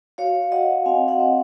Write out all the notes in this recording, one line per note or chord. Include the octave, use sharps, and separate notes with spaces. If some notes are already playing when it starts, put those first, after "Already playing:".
F#4 C#5 F5
F#4 D#5 F#5
C4 F5 G#5
D#5 F#5
C4